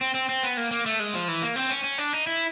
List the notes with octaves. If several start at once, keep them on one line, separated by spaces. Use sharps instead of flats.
C4
C4
C4
B3
A#3
A#3
A3
G#3
F3
E3
A#3
C4
C#4
C#4
D4
D#4
E4